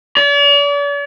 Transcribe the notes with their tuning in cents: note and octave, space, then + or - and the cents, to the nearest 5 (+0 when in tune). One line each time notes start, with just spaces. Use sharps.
D5 -45